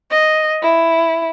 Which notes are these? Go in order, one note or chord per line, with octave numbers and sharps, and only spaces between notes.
D#5
E4